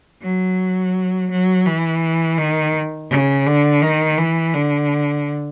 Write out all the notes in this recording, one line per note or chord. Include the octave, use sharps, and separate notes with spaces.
F#3
F#3
E3
D#3
C#3
D3
D#3
E3
D3